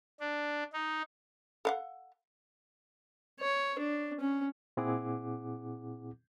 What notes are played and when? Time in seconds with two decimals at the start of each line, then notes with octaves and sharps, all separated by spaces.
0.20 D4
0.73 D#4
1.65 A4 F5 F#5
3.40 C#5
3.78 D4
4.20 C#4
4.77 A#2 C4 E4 G#4 F#5 D6